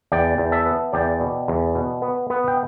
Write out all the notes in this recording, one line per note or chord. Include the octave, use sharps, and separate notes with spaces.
E2 D5 G5
E2
E5 A5
B3
E2 D5 G5
B2
E2
B2
B3
B3
G5